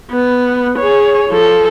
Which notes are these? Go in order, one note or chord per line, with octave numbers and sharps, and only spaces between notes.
B3
G#4 C#5
F3 A4